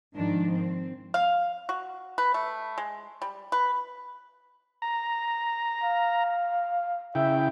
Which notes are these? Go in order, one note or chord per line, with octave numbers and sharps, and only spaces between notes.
G#2 D#3 F3 D4
C4
F5
F#4
B4
A3
G#3
G3
B4
A#5
F5
C#3 E4 E5 G5